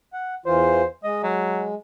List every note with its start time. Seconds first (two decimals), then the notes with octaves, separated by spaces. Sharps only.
0.13 F#5
0.46 E2 E3 F4 C5
1.04 G#3 D#5
1.23 F#3